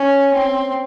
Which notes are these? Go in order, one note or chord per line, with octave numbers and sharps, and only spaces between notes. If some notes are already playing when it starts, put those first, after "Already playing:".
Already playing: C#4
C4